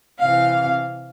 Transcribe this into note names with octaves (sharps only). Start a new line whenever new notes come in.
C3 E3 F5